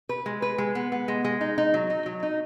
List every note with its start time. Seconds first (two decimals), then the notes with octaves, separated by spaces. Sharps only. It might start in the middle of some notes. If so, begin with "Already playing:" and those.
0.09 B4
0.26 G#3
0.42 B4
0.58 G#3
0.75 B3
0.92 B3
1.08 G#3
1.24 G#3
1.41 D#4
1.58 D#4
1.74 F#3
1.90 D#4
2.06 F#3
2.23 D#4